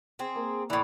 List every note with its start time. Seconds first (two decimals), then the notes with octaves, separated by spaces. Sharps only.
0.19 C4 G#4
0.35 A#3
0.70 A2 E3 E4 D5